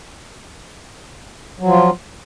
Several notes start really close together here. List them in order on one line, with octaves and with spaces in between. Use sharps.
F#3 F3 F4